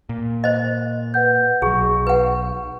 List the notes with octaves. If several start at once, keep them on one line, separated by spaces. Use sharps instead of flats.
A#2
C5 D#5
B4 F#5 G6
B1 F#3 G#4 C#6
B4 F#5